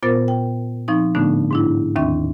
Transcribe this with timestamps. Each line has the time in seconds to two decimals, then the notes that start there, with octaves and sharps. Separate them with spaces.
0.03 A#2 B3 F4 A#4 C5 A6
0.28 G5
0.88 F3 C4 D#4 C#6
1.15 A2 D3 A3 B3 D4 D#4
1.51 G#2 D4 E4
1.96 D#2 D#3 C4 D4 E5 C#6